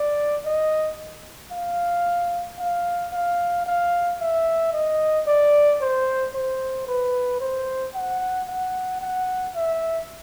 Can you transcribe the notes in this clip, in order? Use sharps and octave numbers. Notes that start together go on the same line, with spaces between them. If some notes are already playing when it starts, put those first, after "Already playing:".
Already playing: D5
D#5
F5
F5
F5
F5
E5
D#5
D5
C5
C5
B4
C5
F#5
F#5
F#5
E5